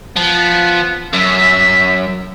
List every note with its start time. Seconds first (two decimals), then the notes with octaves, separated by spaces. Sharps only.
0.16 F3 B3
1.13 F#2 E5